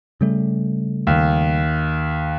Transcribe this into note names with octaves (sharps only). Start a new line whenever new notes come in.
C#3 G3 A3
D#2